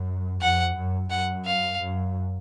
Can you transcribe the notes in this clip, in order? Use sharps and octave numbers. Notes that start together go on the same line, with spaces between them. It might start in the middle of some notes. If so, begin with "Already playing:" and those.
Already playing: F#2
F2 F#5
F#2
F#2 F#5
F5
F#2